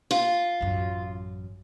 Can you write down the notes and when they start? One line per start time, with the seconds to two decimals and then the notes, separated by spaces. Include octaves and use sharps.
0.11 F4
0.61 A1 F#2